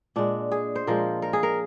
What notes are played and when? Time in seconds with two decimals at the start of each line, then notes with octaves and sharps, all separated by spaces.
0.16 A#2 G#3 D4
0.52 G#4
0.75 C5
0.87 A#2 F3 G#3 A#4
1.22 A#4
1.33 G#4
1.43 A#4